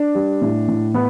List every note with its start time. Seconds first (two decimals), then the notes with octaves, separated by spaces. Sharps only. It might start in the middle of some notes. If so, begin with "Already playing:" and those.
Already playing: D4
0.15 G3
0.41 A2
0.68 A2
0.94 A2 B3